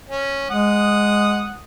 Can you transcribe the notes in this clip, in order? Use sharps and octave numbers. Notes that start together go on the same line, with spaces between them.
C#4
G#3 F#5 D#6